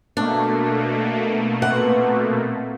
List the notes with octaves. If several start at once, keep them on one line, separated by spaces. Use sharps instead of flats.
B2 A3 A#3 D4
A#2 B3 C4 F#5